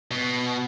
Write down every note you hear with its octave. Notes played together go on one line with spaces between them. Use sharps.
B2